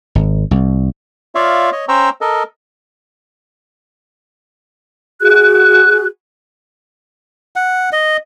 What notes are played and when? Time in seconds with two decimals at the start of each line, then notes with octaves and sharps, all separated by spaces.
0.15 G#1
0.51 C2
1.35 F4 C#5 D5 E5 F5
1.72 C#5 D#5
1.88 C#4 C5 G5 A#5 C#6 E6
2.21 A4 A#4 D#5
5.21 F#4 G#4 F#6
7.56 F#5
7.93 D#5